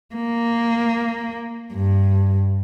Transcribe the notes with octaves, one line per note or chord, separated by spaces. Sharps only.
A#3
G2